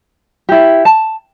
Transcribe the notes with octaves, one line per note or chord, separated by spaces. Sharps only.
E4 G4
A5